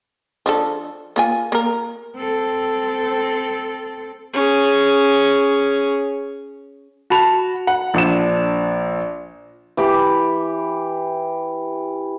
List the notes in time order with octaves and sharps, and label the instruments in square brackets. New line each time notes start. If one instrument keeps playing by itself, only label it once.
[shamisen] F3 D4 A4
A#3 F4 G#5
A#3 A#4
[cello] C4 A4
[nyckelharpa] C#4 G#4
[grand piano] F#4 A5 B5 F7
F#5
A#1 D4 E7
[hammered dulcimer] E3 G4 B5 D6